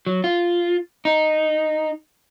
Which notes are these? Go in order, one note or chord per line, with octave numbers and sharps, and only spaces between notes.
F#3
F4
D#4